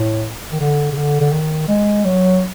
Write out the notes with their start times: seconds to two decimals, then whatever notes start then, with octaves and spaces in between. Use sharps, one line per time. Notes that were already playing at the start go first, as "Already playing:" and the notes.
Already playing: A2
0.52 D#3
0.61 D3
0.92 C#3
0.96 D3
1.21 D3
1.32 D#3
1.68 G#3
2.05 F#3